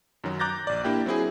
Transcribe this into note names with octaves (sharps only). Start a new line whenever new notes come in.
F#2 D#3 F#3
A#5 D6 F#6 G6 A6 A#6
A#1 D5
A#3 D4 E4 G4 G5
F#3 C4 E4 G#4